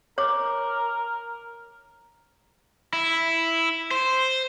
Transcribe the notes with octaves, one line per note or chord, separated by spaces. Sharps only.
A#4 C#5 D6
E4
C5